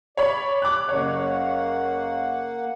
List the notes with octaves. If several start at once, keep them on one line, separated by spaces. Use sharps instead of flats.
C#5 D5 B5
D6 F#6
F#1 A#3 C#5 F#5